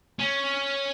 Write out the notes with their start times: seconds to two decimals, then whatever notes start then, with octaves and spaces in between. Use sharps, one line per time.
0.20 C#4